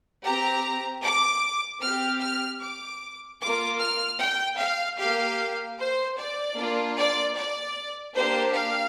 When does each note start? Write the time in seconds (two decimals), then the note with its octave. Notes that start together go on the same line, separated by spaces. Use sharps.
0.25 C4 G4 A#5
1.04 D6
1.82 C4 G4 F6
2.22 F6
2.62 D6
3.41 A#3 F4 D6
3.80 F6
4.20 G5
4.60 F5
4.99 A#3 G4 F5
5.79 C5
6.18 D5
6.58 A#3 D4 F4
6.98 D5
7.36 D5
8.16 A#3 D4 G4 C5
8.55 F5